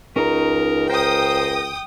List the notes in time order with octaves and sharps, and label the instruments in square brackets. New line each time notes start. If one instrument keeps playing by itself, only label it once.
[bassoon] C#2 [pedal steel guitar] C#4 D#4 A#5 [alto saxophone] A#4
[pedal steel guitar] A#4 [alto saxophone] C5 [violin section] G5 D#6